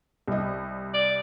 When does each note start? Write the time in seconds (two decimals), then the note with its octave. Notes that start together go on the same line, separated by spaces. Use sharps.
0.28 C2 D#5
0.94 D5